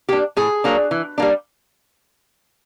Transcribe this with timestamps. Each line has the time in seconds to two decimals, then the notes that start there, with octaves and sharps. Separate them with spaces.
0.09 A#3 D4 G4
0.37 A2 G#4
0.64 F#3 A#3 D4
0.91 E3
1.18 G3 A#3 D4